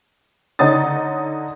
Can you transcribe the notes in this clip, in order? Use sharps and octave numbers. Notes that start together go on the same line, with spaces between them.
D3 D#4 C#5 F#5 D#6 A6